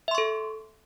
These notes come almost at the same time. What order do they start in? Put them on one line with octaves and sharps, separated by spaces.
E5 C6 C#6 A4